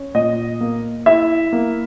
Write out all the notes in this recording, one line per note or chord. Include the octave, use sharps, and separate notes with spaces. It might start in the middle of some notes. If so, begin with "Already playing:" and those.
Already playing: C#4
A#2 D#5
A#3
E4 E5
A#3